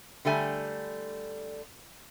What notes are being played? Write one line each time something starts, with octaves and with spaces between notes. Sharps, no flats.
D3 G3 A3 G#5